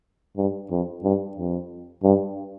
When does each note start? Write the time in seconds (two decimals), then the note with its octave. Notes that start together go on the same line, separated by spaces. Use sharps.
0.37 G2
0.71 F2
1.04 G2
1.37 F2
2.03 G2